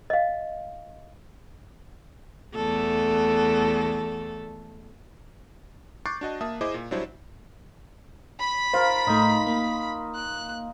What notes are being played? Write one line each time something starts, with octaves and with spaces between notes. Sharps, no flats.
D#5 F5
E2 A3 A4
C#6 D6 F#6 G6 A6 C7
D4 F#4 D#5 A5
A#3 E5 A5 D#6
E4 G#4 C5 D#5 E5 D6
A#2
F#3 G3 D4 E4 C5
B5 B6
F4 A#4 C5 F5
A2 A3 D#4
A#3
F#6